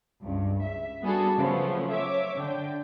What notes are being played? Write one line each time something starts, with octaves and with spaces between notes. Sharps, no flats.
C#2 G2
E5
G3 B3 D4 F#4 G#4 A4
C#3 F3 F#3 A3 B3 C#4
C#5 E5 D6
D3 G5